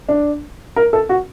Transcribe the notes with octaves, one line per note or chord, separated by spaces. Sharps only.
D4
A#4
A4
F#4